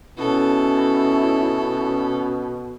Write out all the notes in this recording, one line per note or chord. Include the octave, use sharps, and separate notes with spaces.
B2 C#4 E4 A4